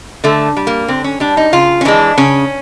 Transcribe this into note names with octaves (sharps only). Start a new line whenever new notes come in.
D3 A3
G3
A#3
D3 C4
C#4
G3 D4
D#4
C#3 F4
C#4
E3 G#3 D4
C#3 C#4